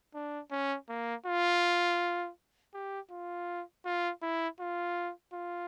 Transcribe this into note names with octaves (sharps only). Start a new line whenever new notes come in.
D4
C#4
A#3
F4
G4
F4
F4
E4
F4
F4